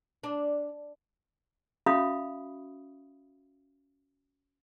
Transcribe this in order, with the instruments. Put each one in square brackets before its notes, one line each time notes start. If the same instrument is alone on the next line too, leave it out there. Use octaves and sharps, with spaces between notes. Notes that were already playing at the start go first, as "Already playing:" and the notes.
[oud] D4
[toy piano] C#4 F#4 E5 F5 B5 D#6